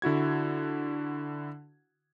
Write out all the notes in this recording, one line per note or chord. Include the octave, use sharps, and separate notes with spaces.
D3 E4 F#4 G#6